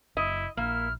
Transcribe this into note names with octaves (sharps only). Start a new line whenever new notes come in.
F#1 E4 D#5
A#1 A#3 E4 F6